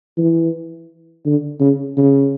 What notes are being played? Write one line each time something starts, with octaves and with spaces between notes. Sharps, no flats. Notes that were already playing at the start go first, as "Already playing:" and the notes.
E3
D3
C#3
C#3